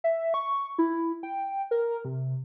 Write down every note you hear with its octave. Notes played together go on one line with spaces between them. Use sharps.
E5
C#6
E4
G5
A#4
C3